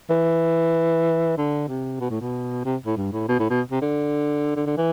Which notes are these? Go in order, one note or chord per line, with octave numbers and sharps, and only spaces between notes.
E3
D3
C3
B2
A2
B2
C3
A2
G2
A2
B2
A2
B2
C3
D3
D3
D3
E3